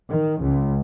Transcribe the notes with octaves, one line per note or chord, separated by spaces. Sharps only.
D#3
C#2